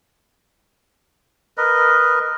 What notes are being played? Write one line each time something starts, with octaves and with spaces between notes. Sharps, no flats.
A#4 B4 D#5